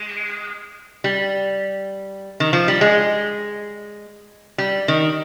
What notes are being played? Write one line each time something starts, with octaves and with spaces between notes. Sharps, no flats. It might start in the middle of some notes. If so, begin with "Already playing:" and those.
Already playing: G#3
G3
D#3
F3
G3
G#3
G3
D#3